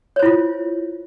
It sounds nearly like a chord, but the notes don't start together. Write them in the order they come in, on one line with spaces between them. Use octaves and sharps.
C#5 C5 E4 F4